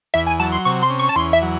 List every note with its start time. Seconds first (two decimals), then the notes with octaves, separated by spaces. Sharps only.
0.14 E2 E5
0.27 G#5
0.39 F#3 A5
0.52 C6
0.65 C3 C#6
0.82 C6
0.90 C#4
0.99 C#6
1.09 A5
1.16 E2 C6
1.33 E5
1.42 F#3